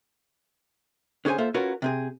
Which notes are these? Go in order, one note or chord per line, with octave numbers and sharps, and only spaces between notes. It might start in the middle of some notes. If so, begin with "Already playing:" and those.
D3 C#4 G#4 C5 G#5
A#3 F4 A4 C5 E5
C#4 F4 F#4 A#4 B4 C#5
C3 C4 G#4